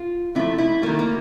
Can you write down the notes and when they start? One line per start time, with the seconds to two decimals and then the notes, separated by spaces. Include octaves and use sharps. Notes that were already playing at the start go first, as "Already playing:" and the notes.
Already playing: F4
0.35 C3 F3 A3 E4
0.58 E4
0.82 D#3 F#3 A3 A#3
0.99 A#3